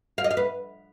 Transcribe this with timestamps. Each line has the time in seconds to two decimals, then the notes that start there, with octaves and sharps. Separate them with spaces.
0.18 F5
0.24 D#5
0.31 F5
0.37 B4